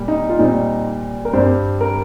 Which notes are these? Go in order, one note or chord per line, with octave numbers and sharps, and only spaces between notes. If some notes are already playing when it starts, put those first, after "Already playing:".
Already playing: A#2 G3
D#4
F4
A#2 G3 C4 D#4
A#4
G2 G3 C4 C5
A#4